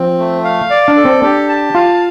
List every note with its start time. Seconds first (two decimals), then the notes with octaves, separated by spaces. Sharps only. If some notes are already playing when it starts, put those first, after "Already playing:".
Already playing: F3 C4
0.19 A3
0.44 F5
0.70 D5
0.88 D4
0.97 A4
1.05 C4
1.23 D4 G4
1.49 A5
1.75 F4 F5